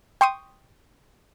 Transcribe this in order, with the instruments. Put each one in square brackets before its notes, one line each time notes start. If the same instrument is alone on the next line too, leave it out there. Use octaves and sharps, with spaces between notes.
[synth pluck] G5 C6 C#6 D#6